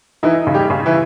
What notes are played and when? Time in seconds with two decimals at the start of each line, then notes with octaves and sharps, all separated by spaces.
0.23 E3 D#4 E4
0.47 C#3
0.54 G3 G4
0.70 C#3
0.86 E3 E4